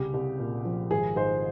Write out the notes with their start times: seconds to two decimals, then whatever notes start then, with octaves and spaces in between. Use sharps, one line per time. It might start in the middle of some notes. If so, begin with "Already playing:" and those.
Already playing: C2 C#3 G4
0.14 C2
0.39 A#2
0.65 F3
0.91 G#1 G#4
1.16 G#2 G#4 C5